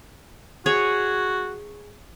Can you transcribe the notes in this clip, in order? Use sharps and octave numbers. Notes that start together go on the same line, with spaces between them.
F#4 G#4 C#5